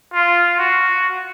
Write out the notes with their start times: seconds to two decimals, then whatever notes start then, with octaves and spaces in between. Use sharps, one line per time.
0.13 F4
0.59 F#4